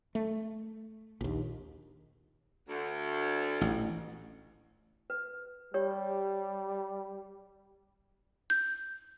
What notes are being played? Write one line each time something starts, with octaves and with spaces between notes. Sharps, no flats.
A3
A#1 D#2
D2
A1
B4
G3 G4 C#5 D5
G6